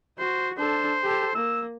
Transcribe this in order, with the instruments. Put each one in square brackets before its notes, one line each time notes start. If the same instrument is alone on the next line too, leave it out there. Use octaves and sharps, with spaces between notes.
[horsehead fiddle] F#4 [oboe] C5
[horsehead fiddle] D4 A4 [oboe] C5
[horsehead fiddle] G4 A4
[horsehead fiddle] A#3 [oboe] E6